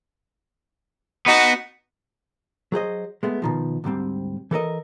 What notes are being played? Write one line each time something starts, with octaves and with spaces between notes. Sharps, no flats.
B3 D#4 F#4
F#3 G#4 C5 D#5
G#3 A3 B3
B2 D#3 F3
D2 G#2 G3 C4
E3 A4 A#4 D#5